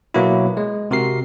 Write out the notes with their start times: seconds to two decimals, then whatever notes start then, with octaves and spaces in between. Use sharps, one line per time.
0.14 B2 F#3 A#3 B3 E4
0.57 G#3
0.91 C3 F#4 A#4 C7